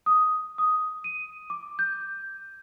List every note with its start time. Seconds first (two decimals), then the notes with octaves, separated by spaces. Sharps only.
0.06 D#6
0.58 D#6
1.04 D#7
1.50 D6
1.79 G6